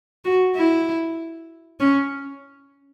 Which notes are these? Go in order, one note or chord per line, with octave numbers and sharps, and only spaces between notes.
F#4
E4
C#4